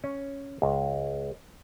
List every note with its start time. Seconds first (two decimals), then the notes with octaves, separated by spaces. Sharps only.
0.04 C#4
0.62 C#2